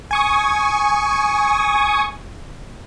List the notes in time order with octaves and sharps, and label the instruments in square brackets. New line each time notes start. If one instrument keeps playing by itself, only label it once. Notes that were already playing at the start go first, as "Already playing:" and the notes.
[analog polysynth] G#5 C#6 D#6